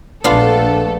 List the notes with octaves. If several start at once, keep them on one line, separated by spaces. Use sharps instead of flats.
A#1 A3 B3 D4 F4 A4